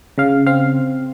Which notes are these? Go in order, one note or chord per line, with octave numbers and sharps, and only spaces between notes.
C#3 F5
C4 F5